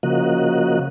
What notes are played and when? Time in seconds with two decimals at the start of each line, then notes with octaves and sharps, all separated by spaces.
0.03 C#3 F3 A#3 F#4 D#5 F#6